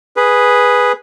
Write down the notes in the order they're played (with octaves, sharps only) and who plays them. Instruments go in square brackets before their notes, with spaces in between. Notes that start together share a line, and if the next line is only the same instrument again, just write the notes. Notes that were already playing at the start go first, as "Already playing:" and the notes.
[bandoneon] G#4 B4